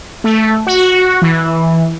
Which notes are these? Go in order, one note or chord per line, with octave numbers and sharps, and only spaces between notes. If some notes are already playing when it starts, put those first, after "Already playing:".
A3
F#4
E3